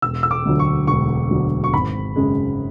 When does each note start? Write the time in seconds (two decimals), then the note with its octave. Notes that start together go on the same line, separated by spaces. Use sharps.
0.02 E1 E6
0.23 E6
0.31 D6
0.45 D2 D3 F#3
0.59 C#6
0.87 E1 C#6
1.31 D2 D3 F#3
1.64 C#6
1.73 G#1 B5
2.16 F#2 C#3 G#3